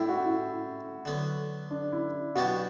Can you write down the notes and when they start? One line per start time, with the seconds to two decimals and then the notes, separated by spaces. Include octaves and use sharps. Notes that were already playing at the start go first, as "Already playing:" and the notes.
Already playing: A2 G3 C4 E4
0.09 F#4
0.25 E4
1.05 D3 F#3 B3
1.71 D4
1.92 E4
2.35 B2 F#3 B3 D4 F#4 G4